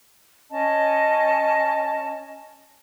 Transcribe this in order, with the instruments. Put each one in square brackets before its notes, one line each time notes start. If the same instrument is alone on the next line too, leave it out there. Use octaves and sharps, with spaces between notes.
[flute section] C#4 D#5 A5